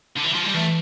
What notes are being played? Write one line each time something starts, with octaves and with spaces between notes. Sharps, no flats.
D3
E3
F3
G3
E3 A3